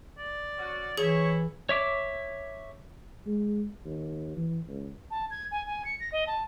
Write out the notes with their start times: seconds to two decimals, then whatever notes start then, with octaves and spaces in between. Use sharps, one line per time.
0.17 D5
0.59 C#4 F#4
0.98 E3 E4 G#4 C#5
1.69 C#5 E5 D6
3.26 G#3
3.86 D#2
4.36 E3
4.67 C#2
5.11 A5
5.30 G#6
5.51 G#5
5.67 G#5
5.85 C#7
6.00 A#6
6.12 D#5
6.27 A5